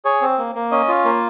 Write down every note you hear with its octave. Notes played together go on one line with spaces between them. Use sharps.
G#4 C#5
C4
A#3
A#3
C#4 D#5
F4
A#3